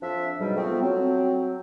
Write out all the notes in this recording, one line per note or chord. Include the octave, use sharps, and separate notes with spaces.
F2 F3 D4 E5
G#2 B2 F#3 G3
F3 A3 B3 C4
F#3 C4